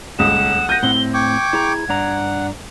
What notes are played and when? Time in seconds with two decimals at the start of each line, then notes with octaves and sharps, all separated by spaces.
0.19 D#1 C#2 F#5 D#6 E7
0.69 G6 A#6 D#7
0.83 A2 C4 E4 G7
1.14 G5 C#6 D6 G#6
1.53 E4 G#4 A#5
1.89 G2 D4 F#5 A#5